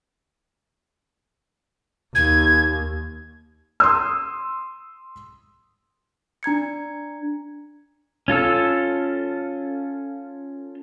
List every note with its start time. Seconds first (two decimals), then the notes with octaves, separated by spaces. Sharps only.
2.15 D#2 G#6
3.80 C6 D#6 E6
6.43 D4 A#5 G#6 C#7
8.28 C#4 F4 A4 E6